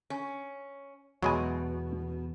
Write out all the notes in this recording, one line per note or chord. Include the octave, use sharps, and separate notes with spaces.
C#4
E2 B2 F#3 G#3 G#5